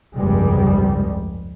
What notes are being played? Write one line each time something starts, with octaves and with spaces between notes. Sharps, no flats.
F1 C#2 G2 C3 G3 G#3